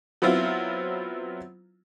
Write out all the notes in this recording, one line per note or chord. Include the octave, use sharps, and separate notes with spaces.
F#3 B3 C4 E4 F4